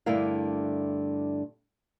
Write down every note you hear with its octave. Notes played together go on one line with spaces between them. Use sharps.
G2 D3 A3 E4 A#4 F5